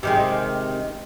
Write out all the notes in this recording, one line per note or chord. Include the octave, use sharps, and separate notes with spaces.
C3 D#3 G#3